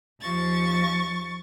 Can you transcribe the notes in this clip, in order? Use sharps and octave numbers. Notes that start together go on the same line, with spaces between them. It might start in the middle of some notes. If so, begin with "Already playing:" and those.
D#2 F3 C#6 A6